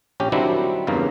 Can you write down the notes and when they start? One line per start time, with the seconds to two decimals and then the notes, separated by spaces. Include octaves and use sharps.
0.20 A#1 C#4 G4
0.32 D#3 F#3 G3 C4 D4 E4
0.87 E2 G2 C#3 A#3